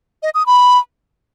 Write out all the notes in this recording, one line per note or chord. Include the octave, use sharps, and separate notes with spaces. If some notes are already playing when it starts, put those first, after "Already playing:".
D#5
D#6
B5